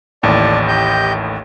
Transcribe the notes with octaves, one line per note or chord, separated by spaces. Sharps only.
A1 D#2 A2 D5 A5
G4 D#5 G6